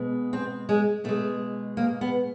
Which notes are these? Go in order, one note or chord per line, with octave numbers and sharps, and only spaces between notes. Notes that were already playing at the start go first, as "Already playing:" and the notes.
Already playing: B2 G#3
C4
G#3
B2 G#3 A3
A#3
B3